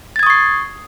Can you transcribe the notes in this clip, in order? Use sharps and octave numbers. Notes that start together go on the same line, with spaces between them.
C#6 D#6 G#6 A6 C7